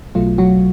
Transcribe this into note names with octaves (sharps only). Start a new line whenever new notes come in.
B1 B2 F#3 A3 F4
F#3 F#4